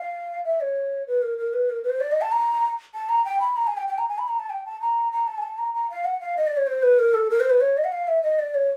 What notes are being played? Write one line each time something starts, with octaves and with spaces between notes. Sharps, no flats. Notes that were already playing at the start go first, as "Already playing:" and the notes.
Already playing: F5
E5
C#5
B4
A#4
A#4
B4
A#4
B4
C5
D5
D#5
A5
A#5
A5
A#5
G5
B5
A#5
G#5
G5
G5
A#5
G#5
B5
A#5
A5
G5
A5
A#5
A#5
A5
G#5
A5
A#5
A#5
F5
F#5
F5
D#5
D5
C#5
C5
B4
A#4
A4
A#4
C5
B4
C#5
D#5
F#5
F5
E5
D#5
D5
C#5